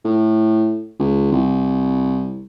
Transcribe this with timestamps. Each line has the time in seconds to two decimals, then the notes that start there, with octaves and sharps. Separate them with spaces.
0.05 A2
0.99 C#2
1.32 C2